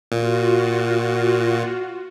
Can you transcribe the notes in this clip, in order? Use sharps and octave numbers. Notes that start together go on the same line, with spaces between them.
A#2 F4 F#4